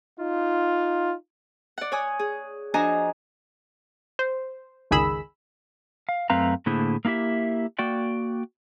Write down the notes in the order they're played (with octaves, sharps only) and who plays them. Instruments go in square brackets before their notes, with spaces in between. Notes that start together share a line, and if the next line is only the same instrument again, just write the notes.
[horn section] D#4 F4
[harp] D5 F#5
C#5 G#5 D#6
G#4
F3 D4 F#4 D#5 G#5 A#5
[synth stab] C5
G1 C#2 D#3 G#4 B5 E6
[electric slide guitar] F5
F#2 A3 C4 B4 F5 A#5
A2 D3 A#3 E4 G#4 C5
A#3 D#4 E4 G4 E5
A#3 F#4 D5 G5